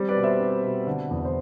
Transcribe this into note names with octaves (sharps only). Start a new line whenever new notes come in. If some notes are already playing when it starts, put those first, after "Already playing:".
Already playing: G3 C4
B4 D5
B2
C5 E5
C4
B2
D3
E2
C5